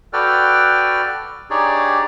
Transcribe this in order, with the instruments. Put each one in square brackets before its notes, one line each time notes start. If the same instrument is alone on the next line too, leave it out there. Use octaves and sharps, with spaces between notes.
[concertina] F#4 A4 B4 D5 G5 F6
D4 D#4 G4 G#4 C#5 D5